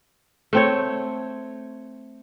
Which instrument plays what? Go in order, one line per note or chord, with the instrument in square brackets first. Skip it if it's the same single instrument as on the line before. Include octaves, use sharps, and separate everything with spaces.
[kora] A3 C4 C#5